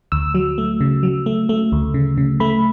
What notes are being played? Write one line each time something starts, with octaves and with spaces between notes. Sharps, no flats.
D2 E6
F#3
A3
C#3
F#3
A3
A3
D2
C#3
C#3
A3 B5